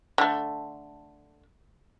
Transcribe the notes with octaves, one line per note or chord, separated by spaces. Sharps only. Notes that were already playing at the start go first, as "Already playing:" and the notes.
D3 A3